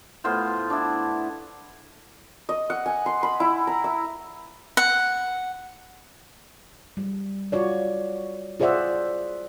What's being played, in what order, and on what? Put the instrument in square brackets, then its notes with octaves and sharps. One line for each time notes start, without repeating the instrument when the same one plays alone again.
[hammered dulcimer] A2 B3 F4 C5
D4 E4
[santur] D#5
F#5
G#5
C6
B5
E4
A#5
E5
[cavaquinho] F#5
[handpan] G3
F4 F#4 C#5 D5
F4 G#4 C5 D5 E5 F#5